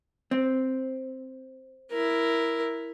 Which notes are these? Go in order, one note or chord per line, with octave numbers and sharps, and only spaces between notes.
C4
E4 A#4